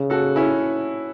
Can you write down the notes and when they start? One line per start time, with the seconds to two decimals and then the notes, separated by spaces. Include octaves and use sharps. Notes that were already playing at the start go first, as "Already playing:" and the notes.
Already playing: C#3
0.10 F#4 A4
0.36 C#4 E4